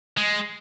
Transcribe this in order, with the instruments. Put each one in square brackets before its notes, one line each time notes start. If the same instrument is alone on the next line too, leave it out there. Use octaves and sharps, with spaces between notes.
[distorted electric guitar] G#3